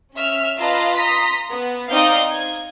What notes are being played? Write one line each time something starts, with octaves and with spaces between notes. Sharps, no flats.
C#4 E5 F6
F4 B4 D#5 F5 A5 A#5
A#5 C6 D#6 B6
B3
C4 D#4 D5 F5 D#6 G6
G#6